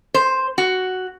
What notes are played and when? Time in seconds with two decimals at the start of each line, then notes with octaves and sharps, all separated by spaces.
0.14 C5
0.58 F#4